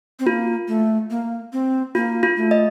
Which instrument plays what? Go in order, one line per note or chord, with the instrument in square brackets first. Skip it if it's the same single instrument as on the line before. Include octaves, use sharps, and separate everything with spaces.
[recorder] C4
[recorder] A#3 [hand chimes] F4
[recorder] A3
A#3
C4
[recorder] A#3 [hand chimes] F4
[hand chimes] F4
[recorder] A3
[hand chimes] D#5